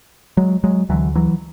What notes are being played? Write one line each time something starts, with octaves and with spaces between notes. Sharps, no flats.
F#3 G#3
F#3 G#3
D2 D3 E3 F#3
E3 F#3